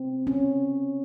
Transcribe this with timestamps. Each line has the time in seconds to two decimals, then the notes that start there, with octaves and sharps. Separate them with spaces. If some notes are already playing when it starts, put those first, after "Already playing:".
Already playing: C4
0.27 C#4